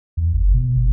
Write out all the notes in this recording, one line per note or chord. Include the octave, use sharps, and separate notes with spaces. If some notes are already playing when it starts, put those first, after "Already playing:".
E2
F#1
B2
F#1